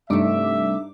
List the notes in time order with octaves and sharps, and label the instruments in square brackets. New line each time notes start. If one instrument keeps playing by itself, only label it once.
[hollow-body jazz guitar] C2 A3 [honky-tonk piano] G2 [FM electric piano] D4 D#4 D6 [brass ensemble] E5